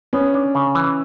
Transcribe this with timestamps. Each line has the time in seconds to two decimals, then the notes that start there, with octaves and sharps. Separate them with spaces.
0.13 B3 C#4
0.34 D4
0.55 C#3
0.75 E3